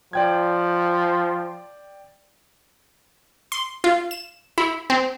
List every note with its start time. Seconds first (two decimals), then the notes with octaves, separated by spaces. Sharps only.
0.13 F3 D5 G5 G#6
3.52 C6
3.84 F4
4.11 E7
4.58 E4
4.90 C4